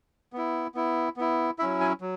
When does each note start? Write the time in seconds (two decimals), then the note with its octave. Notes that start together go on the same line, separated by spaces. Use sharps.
0.33 B3 E4
0.75 B3 E4
1.17 B3 E4
1.59 E4 E5
1.62 F#3 C#4
1.81 G#5
2.01 F#3